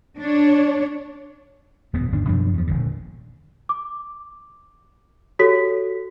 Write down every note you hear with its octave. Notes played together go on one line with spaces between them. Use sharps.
D4 C#5
D#1 F#2 B2 B3
G1 D#2 G#2 D4
F#2 B2 F3 D4
E2 F3
D#1 A#1 D3
D6
F#4 G4 A4 C#5 B6